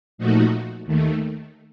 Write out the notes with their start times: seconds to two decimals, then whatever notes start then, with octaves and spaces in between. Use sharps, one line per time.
0.18 A#2 F3 A3 D#4 F#4
0.86 D#2 D#3 A3